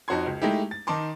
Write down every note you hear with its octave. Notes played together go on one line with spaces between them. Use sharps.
F2 D#4 F#4 C#5 C6 G#6
C#2
G#3 A3 D#4 E4 G4
A6
D#3 D#4 A5 C6 D6